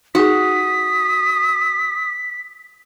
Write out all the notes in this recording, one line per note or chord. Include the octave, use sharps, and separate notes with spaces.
D#4 F#4 G#4 D#6 B6